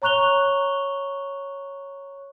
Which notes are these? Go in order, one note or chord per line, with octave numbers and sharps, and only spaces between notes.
C#5 A#5 C#6 F#6 F7 G7